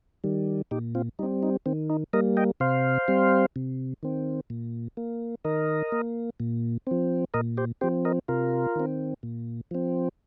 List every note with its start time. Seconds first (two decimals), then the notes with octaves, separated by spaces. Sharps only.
0.24 D#3 G3
0.71 A#2 D#4 G4
0.95 C4 F4
1.19 G3 C4 D#4
1.43 D#4
1.66 D#3 C4
1.90 D#4
2.13 G3 A#3 A#4 D#5
2.37 D#5 G5
2.60 C3 C5 F5
3.08 G3 C4
3.56 C3
4.03 D#3 C4
4.50 A#2
4.97 A#3
5.44 D#3 A#4 D#5
5.92 A#3
6.40 A#2
6.87 F3 C4
7.34 A#2 A#4 D#5
7.57 G4 C5
7.81 F3 C4 G4 C5
8.05 A#4 D#5
8.28 C3 F4 A#4
8.76 D#3 C4
9.23 A#2
9.71 F3 C4